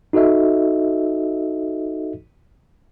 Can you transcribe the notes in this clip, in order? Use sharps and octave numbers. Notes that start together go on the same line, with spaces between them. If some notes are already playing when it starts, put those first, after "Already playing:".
D#4 F#4 A4 D#5 E5